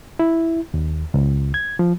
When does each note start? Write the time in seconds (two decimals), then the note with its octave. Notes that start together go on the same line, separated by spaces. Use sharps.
0.19 E4
0.74 D#2
1.14 C#2
1.54 G#6
1.79 F3